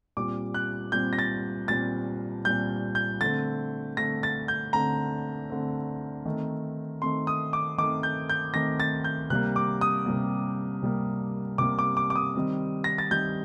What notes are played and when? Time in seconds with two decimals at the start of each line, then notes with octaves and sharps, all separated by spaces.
0.17 A#2 G3 C4 D6
0.54 F#6
0.92 A#2 G3 C4 G6
1.13 A#6
1.19 A6
1.68 A#2 G3 C4 A6
2.44 A#2 G3 C4 G6
2.95 G6
3.21 D3 A3 C4 A6
3.97 D3 A3 C4 A#6
4.23 A6
4.48 G6
4.73 D3 A3 C4 A#5
5.49 D3 A3 C4
6.26 D#3 A3 C4
7.02 D#3 A3 C4 C6
7.27 D#6
7.53 D6
7.78 D#3 A3 C4 D6
8.03 G6
8.29 G6
8.54 D#3 A3 C4 A#6
8.80 A6
9.04 G6
9.30 C3 G3 A#3 F#6
9.56 D6
9.81 D#6
10.06 C3 G3 A#3
10.82 C3 G3 A#3
11.58 C3 G3 A#3 D6
11.79 D6
11.97 D6
12.10 D6
12.16 D#6
12.36 D#3 G3 C4
12.84 A#6
12.98 A6
13.11 D#3 G3 C4 G6